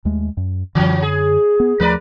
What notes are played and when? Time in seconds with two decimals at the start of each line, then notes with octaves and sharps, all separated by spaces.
0.05 D#2 G#3 A3
0.37 F#2
0.75 F#2 D3 E3 F#3 C#4
1.02 G#4
1.60 B3
1.80 D#2 F3 A3 A#4 B4 D5